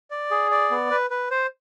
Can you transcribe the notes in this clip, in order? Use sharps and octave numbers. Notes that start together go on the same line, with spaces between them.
D5
G#4
D5
B3
B4
B4
C5